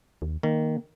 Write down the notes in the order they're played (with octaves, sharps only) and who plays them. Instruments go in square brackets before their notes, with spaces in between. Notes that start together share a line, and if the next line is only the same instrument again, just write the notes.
[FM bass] D#2
[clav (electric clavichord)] D#3 [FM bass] A#3